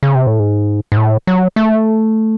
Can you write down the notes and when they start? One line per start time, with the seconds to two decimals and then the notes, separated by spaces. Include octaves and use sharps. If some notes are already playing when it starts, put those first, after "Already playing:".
0.03 C#3
0.15 C3
0.27 A2
0.39 G#2
0.92 G#2
0.97 A2
1.27 F#3
1.56 A3